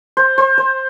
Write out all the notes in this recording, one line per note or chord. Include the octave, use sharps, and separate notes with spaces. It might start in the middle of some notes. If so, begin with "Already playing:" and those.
C5
C5
C5